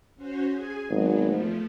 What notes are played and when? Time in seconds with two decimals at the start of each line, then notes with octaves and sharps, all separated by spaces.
0.16 C#4 F#4 C5
0.51 G#4 G#5
0.90 G#1 F#3 B3
1.23 F3 A3